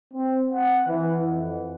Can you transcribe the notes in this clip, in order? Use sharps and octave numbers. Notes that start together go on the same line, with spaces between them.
C4
F#5
E3
F2